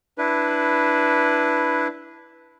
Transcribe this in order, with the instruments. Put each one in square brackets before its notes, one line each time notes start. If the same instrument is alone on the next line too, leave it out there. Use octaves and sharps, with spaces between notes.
[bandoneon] D4 E4 B4